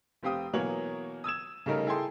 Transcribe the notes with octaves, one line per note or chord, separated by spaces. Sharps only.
F1 C4 G4 F5 G5 D#6
B2 E3 F#3 A#3 C#5 F#7
D#6 E6 G#6 E7
C#3 G3 A3 D#4 A#4
E4 G#4 A4 G5 C6